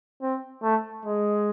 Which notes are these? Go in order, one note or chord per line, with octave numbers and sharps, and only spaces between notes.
C4
A3
G#3